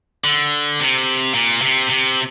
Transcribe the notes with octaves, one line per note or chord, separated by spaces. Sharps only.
D3
C3
A#2
C3
C3